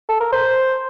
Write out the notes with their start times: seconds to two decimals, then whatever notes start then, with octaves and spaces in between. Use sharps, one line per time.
0.09 A4
0.20 A#4
0.32 C5